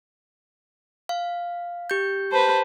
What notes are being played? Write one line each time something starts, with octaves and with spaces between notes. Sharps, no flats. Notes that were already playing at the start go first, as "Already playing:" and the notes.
F5
G4 G6
B4 C5 A5